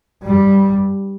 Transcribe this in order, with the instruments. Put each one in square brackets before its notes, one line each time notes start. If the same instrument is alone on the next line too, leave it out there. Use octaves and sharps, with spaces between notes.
[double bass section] G2 G3